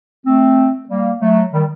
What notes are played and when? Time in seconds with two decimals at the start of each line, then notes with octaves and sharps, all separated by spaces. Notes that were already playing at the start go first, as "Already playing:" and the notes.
0.26 A3 C4
0.89 G3 A#3
1.21 F#3 A3
1.53 D#3 G3